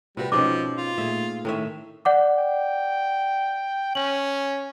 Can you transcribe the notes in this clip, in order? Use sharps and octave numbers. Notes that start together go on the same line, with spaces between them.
C3 G3 F4 F#4 B4
G#2 B2 F3 C4 C#4 D#4 D6
F4
A#2 A3 G#4 E5
A2 D#3 C#4 D#4 E5
D5 F#5 D6
G5
C#4 F#7